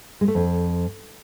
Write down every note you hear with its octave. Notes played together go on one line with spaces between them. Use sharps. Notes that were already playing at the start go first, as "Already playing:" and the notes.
G#3
A3
F2